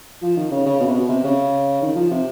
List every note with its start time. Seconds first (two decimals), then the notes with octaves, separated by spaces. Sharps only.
0.22 F3
0.37 D#3
0.51 C#3
0.66 C#3
0.80 B2
0.88 C3
0.94 B2
1.09 C3
1.24 C#3
1.82 D#3
1.95 F3
2.10 C3